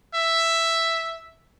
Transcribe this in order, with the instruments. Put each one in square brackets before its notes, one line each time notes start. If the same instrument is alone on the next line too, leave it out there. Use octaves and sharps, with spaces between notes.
[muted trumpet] E5